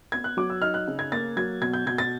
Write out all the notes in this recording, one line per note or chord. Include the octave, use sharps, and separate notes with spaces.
B3 G#6
F#6
F#3 D6
E6
D#4 F6
F#6
C#3
G#6
A#3 A6
F#3 G#6
B2 G#6
G6
B2 G#6
A6